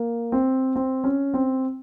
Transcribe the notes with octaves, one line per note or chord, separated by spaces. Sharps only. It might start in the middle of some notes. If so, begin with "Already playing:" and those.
Already playing: A#3
C4
C4
C#4
C4